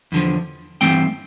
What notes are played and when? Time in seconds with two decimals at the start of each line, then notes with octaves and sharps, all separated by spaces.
0.12 E2 D3 F3
0.81 G2 E3 A3 C4 G5